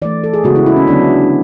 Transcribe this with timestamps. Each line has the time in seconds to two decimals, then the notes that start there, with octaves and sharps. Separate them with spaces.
0.02 E3 A3 D5
0.24 A4
0.34 G#4
0.44 C#3 G#3 B3 F#4
0.56 E4
0.66 E4
0.77 C#4
0.87 D3 F#3 B3 D4